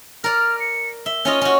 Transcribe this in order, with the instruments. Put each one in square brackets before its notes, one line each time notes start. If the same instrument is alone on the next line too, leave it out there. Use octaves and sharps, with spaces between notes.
[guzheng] A#4 D5 [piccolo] F6
[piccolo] C#7
[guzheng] E5 [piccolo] G7
[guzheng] C#4 F4 D#5
C#4 F#4